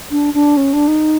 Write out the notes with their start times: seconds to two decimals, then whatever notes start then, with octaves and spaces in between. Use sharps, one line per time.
0.11 D4
0.34 D4
0.57 C#4
0.73 D4
0.88 D#4